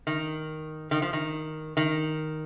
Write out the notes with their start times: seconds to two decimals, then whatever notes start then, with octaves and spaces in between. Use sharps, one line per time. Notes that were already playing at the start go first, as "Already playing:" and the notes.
0.07 D#3
0.91 D#3
1.02 F3
1.13 D#3
1.77 D#3